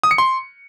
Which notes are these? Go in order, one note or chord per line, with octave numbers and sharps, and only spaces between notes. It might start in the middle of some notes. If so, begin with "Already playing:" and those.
D#6
C#7
C6